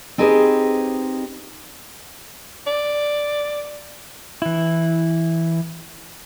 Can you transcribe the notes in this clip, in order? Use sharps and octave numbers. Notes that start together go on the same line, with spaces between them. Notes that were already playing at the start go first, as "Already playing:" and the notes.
C4 D#4 G4 G#4 B4 C5
D5
E3 E4